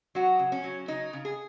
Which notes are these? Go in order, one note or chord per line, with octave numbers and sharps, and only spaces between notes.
F#3 F#4
C#3
C#4
F#3
C#3 D#4
C#3
G#4